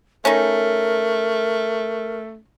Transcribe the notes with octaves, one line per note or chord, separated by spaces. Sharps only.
A3 C#4 D#4 A#4